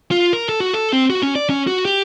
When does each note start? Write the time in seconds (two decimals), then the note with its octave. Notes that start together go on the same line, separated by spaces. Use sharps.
0.11 F4
0.33 A#4
0.49 A4
0.60 F#4
0.73 A4
0.93 C4
1.10 F#4
1.23 C#4
1.36 D5
1.50 C#4
1.67 F#4
1.85 G4